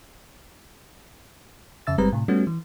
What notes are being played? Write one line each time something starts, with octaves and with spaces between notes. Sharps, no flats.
F2 C#3 E5 E6 A6
G1 G3 G#3 C4 B4 A#5
A2 C3
G3 A3 B3 C#4 F#4
E3